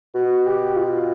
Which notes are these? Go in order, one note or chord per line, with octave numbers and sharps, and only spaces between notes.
B2 F#4
G4
F4